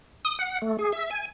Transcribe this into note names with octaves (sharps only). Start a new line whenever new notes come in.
D#6
F#5
A3
G#4
E5
G#5